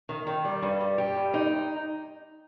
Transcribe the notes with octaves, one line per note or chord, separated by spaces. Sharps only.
D#3
D#3
G3
G2
G3
G4
G2
D#4